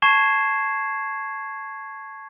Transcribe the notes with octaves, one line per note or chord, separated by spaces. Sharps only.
A5 C#6 G#6 C7 E7